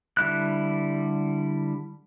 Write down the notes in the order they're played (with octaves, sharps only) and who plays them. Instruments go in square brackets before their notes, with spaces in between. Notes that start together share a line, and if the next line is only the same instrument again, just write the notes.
[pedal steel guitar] D3 G3 E4 F#6